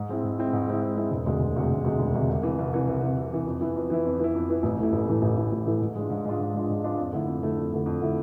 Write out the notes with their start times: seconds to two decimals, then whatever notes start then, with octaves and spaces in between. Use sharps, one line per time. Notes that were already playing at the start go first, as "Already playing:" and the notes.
Already playing: G#2
0.09 G#3 C4 E4
0.23 G#2
0.38 G#3 C4 E4
0.53 G#2
0.67 G#3 C4 E4
0.82 G#2
0.97 G#3 C4 E4
1.11 E1
1.26 D2 C3 G#3
1.40 E1
1.56 D2 C3 G#3
1.70 E1
1.84 D2 C3 G#3
1.99 E1
2.14 D2 C3 G#3
2.29 C2
2.43 C3 E3
2.59 C2
2.73 C3 E3
2.87 C2
3.02 C3 E3
3.17 C2
3.31 C3 E3
3.47 F2
3.61 E3 B3 E4
3.76 F2
3.90 E3 B3 E4
4.05 F2
4.20 E3 B3 E4
4.35 F2
4.48 E3 B3 E4
4.63 A1
4.79 A2 E3 A3 E4
4.93 A1
5.08 A2 E3 A3 E4
5.22 A1
5.37 A2 E3 A3 E4
5.52 A1
5.66 A2 E3 A3 E4
5.81 G#2
5.96 G#3 D4 F4
6.10 G#2
6.25 G#3 D4 F4
6.40 G#2
6.54 G#3 D4 F4
6.69 G#2
6.84 G#3 D4 F4
6.99 F2
7.13 D3 A3 E4
7.27 F2
7.42 D3 A3 E4
7.57 F2
7.72 D3 A3 E4
7.86 F2
8.01 D3 A3 E4